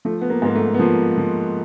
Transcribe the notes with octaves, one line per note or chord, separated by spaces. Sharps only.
F3 A3
B3
A#3
G#2 A#3
A3
B3
F3 A#3
F3